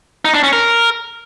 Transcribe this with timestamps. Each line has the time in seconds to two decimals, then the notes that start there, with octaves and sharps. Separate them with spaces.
0.25 D#4
0.34 D4
0.44 C#4
0.53 A#4